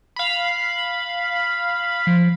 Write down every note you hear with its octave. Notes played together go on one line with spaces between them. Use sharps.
F5 B5
F3